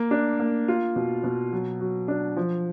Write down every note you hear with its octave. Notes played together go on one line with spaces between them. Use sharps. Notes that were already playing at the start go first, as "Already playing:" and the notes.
Already playing: A#3
D4
A#3
F4
B2
B2
F#3
F#3
D4
F3